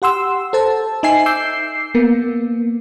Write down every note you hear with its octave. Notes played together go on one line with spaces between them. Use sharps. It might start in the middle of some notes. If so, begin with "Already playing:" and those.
G4 F#5 C6 E6
A4 C5 A5
D#4 E5 G#5 C7
D6 E6 G6 C7
A#3 B3